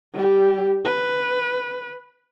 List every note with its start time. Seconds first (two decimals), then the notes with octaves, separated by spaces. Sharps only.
0.14 G3 G4
0.85 B4